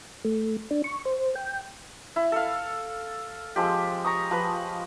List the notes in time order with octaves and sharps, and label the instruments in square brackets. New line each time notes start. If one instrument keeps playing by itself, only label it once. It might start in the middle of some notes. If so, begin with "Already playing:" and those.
[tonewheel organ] A3
D4
C#6
C5
G5
[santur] E4
A4 F5
F3 G#3 C4 G4
A#5 C#6 D#6
F3 B4